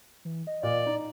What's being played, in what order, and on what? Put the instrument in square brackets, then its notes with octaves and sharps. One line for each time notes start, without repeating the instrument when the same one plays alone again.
[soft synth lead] E3
D#5
[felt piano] A#2 [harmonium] D5
[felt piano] D#4